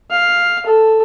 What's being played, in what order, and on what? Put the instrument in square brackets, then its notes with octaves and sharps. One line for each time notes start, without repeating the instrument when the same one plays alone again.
[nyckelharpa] F5
A4